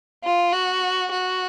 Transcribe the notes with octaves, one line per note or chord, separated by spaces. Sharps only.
F4
F#4
F#4